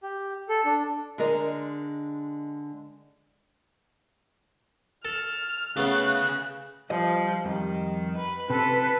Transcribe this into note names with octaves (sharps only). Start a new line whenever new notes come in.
G4
A4
D4
D3 G#3 G#4 A#4 D5
A4 F6
C#3 A3 B3 G#4 F5 F#6
F3 G3 B4 D#5
F2 D#3 G3
B4
C3 A4 B4